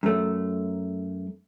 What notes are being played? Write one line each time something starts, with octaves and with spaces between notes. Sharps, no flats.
F#2 A3